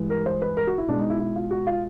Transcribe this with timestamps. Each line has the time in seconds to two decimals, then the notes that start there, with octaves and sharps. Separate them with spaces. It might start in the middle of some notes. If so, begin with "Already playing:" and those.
Already playing: G2 E3 G#3
0.10 A#4
0.26 C5
0.42 B4
0.57 A#4
0.67 F#4
0.78 E4
0.88 B2 G#3 D4
0.99 D#4
1.10 E4
1.20 E4
1.36 F4
1.51 F#4
1.67 F4